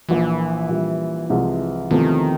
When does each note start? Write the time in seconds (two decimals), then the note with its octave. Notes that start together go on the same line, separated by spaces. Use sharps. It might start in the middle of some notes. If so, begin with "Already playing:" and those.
0.09 A#1 A#2 E3 F3
0.69 A#1 A#2 G3
1.30 C2 C3 F3 G#3
1.91 E2 C3 D#3 F3 A3